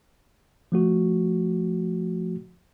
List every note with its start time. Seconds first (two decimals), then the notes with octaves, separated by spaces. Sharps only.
0.72 F3 A3 F#4